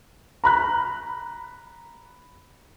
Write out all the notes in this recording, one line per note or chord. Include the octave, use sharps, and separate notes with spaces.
A#5 B5 F#6